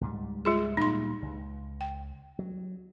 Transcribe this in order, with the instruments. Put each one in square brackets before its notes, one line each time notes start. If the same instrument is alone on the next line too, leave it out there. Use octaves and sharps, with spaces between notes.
[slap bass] C#2 G#2 G3
[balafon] G#3 F4 G#4
[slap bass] D2 A#2 G3 [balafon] D#4 C6
[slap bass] C#2
[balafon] G5
[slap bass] F#3